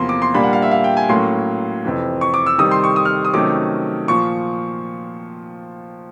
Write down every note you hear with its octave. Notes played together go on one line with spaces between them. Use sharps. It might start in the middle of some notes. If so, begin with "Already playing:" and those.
Already playing: E2 C3 F3 A#3 C6
D6
C6
A#2 G3 A#3 D4 B5
F#5
F5
E5
F5
G5
G#5
A2 F#3 A#3 C#4 C6
F2 C3 E3
C#6
D6
E6
C3 D#3 G3 D#6
C6
C#6
D#6
F6
D#6
C3 D#3 F#3 A3 C#4 D6
A#2 F3 C#6